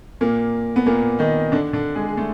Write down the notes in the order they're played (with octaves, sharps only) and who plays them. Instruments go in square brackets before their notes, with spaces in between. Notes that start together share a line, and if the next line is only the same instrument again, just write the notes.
[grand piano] A#2 A#3
B3
A#2 A#3
D#3 D#4
D3 D4
D3 D4
G#3 G#4
G#4
A3 A4